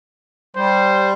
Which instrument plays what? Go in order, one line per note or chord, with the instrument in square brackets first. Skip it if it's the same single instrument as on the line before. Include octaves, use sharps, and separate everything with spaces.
[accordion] G3 [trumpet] C5